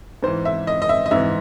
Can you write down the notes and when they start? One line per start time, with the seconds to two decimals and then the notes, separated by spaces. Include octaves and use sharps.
0.23 G#2 E3 C5
0.45 E5
0.67 D#5
0.82 D#5
0.89 E5
1.06 D#5
1.11 G#2 E3 E5